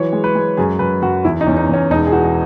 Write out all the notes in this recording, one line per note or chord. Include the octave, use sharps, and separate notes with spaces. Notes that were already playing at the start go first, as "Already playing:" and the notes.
Already playing: E3 F#3 C#5
G#3
B4
G#3
F#2 G#4
F#2 B4
F#2 F#4
E2 E4
D#4
E2 C#4
D#4
E2 C#4
E1 D#4
G#4
E3 F#4